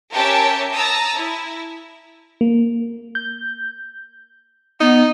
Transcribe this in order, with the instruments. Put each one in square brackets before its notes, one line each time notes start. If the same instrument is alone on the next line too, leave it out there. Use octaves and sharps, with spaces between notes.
[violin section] C#4 G4 A#4 E5 G5 A5
A5 A#5 D#6 E6
E4
[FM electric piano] A#3
G6
[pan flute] B3 [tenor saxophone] D#4